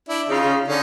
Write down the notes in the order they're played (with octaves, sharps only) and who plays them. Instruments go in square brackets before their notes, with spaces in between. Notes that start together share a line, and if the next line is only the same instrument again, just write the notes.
[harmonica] D4 E4
[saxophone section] C#3 [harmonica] D#4 F4
[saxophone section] C#3
[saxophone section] D3 [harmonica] C#4 D#4